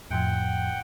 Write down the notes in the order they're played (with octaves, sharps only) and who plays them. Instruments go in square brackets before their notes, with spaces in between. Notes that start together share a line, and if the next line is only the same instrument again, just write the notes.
[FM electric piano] F2 A2 F3 [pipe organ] F#5 G5